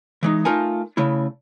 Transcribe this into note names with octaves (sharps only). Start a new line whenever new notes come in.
E3 G#3 D#4
A3 D#4 F4 A4 A#4 G#5
C#3 A3 E4